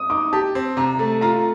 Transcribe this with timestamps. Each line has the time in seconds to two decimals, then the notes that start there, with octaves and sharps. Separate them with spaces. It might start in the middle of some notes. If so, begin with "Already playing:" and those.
Already playing: D#6
0.10 D#4 D6
0.32 G4 A5
0.55 C4
0.77 C3 A#5
0.99 A3
1.21 F4 A#5